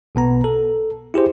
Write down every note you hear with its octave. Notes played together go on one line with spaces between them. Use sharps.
B1 B2 B3 A#5
A4
E4 G4 G#4 C5